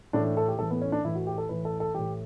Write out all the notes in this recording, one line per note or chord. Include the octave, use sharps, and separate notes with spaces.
A2 E3 D4
D4
A4
G4
A2 E3 A4
B3
C#4
D4
A2 E3 E4
F#4
G4
A4
A2 E3 B4
A4
A4
A2 E3 G4